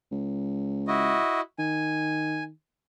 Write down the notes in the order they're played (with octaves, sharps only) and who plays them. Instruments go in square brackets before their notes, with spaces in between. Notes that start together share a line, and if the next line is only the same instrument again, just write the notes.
[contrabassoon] C#2
[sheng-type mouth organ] E4 F#4 D#5
[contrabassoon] D#3 [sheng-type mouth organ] G#5